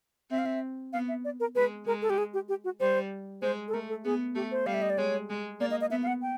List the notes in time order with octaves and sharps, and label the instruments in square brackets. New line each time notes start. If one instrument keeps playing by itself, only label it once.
[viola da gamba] C4 [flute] E5
[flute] F5
E5
[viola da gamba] B3 [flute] F5
[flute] E5
D5
A#4
[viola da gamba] G#3 [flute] B4
[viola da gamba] G#3 [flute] A#4
[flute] A4
G4
G#4
G4
G4
F#4
[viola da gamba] G3 [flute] C5
[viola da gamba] G#3 [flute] C5
[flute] A4
[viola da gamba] A3 [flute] A#4
[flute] A4
[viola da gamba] B3 [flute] G#4
[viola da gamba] A3 [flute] G4
[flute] C5
[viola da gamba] G3 [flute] F5
[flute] E5
D#5
D5
[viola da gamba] G#3 [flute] C#5
[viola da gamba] G#3
[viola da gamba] A#3 [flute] D5
[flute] D#5
D#5
[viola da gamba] B3 [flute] E5
[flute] F5
F#5
G5